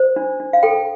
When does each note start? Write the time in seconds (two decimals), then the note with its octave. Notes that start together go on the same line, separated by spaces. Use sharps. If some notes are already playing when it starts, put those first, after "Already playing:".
Already playing: C5
0.16 D4
0.40 D4
0.53 F5
0.63 A4 G5